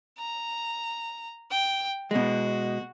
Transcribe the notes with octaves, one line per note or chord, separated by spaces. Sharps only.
A#5
G5
B2 G#3 F#4